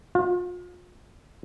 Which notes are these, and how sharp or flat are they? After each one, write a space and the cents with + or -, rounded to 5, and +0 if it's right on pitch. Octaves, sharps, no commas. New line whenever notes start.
F4 +35